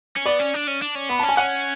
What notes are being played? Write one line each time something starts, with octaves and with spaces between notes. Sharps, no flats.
C#4
B3 D5
C#4
D4
C#4
D4
C#4
B3 B5
C#4 A5
G#5
C#4 F#5